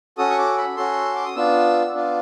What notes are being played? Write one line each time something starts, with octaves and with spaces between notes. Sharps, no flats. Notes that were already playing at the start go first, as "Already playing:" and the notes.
C#4 F#4 A4 D#6
C#6
D6
B5
C#4 F#4 A4 C6
D6
D#6
B3 D4 F4 E6
B3 D4 F4